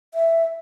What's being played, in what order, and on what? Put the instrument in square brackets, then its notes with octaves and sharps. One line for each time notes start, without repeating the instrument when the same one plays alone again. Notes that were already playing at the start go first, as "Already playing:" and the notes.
[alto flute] E5